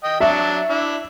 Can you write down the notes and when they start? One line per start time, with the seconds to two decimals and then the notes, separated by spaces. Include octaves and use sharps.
0.04 D#5 G5
0.20 F#3 D4 E5 A5
0.69 D4 E4